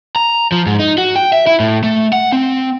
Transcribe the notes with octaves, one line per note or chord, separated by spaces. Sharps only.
A#5
F3
G#2
D#4
F#4
G5
E5
E4
A2
A3
F#5
C4